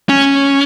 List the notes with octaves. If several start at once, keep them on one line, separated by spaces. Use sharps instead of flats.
C#4